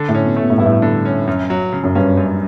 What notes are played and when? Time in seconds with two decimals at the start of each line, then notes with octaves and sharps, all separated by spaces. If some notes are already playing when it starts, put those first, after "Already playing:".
Already playing: D3
0.09 A2
0.15 C#4
0.25 B2
0.36 A3
0.42 B2
0.50 A2
0.58 G2 E4
0.66 A2
0.82 D3
1.05 C#4
1.27 F#2
1.50 F#3
1.73 C#3
1.84 F#2
1.95 G2 C#4
2.17 F#2